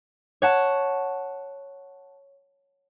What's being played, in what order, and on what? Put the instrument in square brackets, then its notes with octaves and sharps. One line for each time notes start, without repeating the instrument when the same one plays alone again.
[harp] C#5 F#5 A5